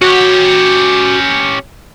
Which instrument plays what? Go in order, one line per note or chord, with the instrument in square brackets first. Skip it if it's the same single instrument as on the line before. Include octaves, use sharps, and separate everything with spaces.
[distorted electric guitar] C#4 G4 [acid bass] F#4